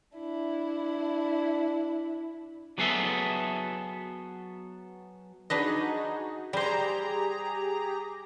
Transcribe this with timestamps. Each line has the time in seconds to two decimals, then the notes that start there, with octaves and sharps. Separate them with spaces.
0.17 D4 E4
2.78 F#3 B3 G#4 A4 E5
5.50 D4 D#4 F#4 G#4 B4 D#5
6.53 G3 G4 G#4 C5 A#5